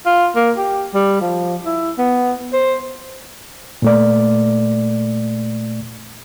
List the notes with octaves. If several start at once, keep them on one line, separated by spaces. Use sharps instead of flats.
F4
A#3
G4
G3
F3
E4
B3
C5
A#2 A3 D5